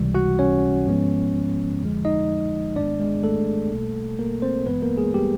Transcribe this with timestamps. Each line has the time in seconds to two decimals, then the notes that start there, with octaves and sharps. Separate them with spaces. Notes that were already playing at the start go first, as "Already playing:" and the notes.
Already playing: C#2 C3 E3 G3
0.14 F#4 F#5
0.39 C#4 C#5
0.86 G#2 F3 G#3 B3
1.81 F2 D3 F3 G#3
2.05 D#4 D#5
2.76 A1 G#2 D#3 G#3 B3 D4 D5
3.00 G#3 G#4
3.23 A3 A4
3.71 B1 B2 G3 A#3
4.19 A#3 A#4
4.42 C4 C5
4.66 A1 G2 E3 G#3 B3 B4
4.82 A#3 A#4
4.98 G#3 G#4
5.14 G3 G4